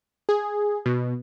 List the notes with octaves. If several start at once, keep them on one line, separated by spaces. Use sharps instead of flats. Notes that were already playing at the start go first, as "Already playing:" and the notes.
G#4
B2